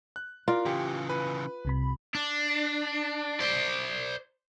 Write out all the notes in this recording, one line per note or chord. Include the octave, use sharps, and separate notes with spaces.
F#6
F4 A#4 D5
C#3 E3 G4
B4
C2 C3 B5
D4
C5 D5